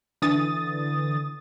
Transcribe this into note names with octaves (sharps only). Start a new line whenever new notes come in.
D3 E3 D#6 A6